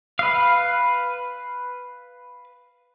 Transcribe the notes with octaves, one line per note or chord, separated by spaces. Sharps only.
B4 F5